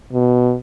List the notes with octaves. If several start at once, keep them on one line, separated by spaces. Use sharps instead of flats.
B2